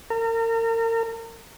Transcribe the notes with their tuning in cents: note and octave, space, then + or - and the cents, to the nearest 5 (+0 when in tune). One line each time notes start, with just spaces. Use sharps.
A#4 -35